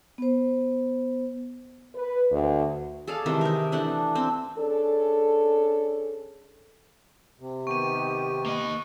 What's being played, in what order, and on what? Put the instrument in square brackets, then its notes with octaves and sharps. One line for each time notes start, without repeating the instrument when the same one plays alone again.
[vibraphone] B3 C5
[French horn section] B4
D2
[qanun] G#4 A4 D5 F5
C3 D#3 E3 G#3
D#4 A#4
E3 A3 D4 F#5
C4
[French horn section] C#4 D4 G#4 A4
[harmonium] C3
[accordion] D#3 B3 G4 [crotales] C#6 D#7
[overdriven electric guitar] A#3 D#5